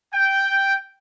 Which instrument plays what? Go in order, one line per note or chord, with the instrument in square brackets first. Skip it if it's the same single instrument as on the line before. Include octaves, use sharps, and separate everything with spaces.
[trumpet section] G5